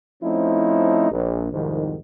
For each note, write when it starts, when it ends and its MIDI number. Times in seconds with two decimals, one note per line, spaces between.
0.23 1.11 53
0.23 1.11 57
0.23 1.11 60
0.23 1.11 61
0.23 1.11 63
0.23 1.11 64
1.12 1.51 34
1.53 1.98 36
1.53 1.98 41
1.53 1.98 44
1.53 1.98 51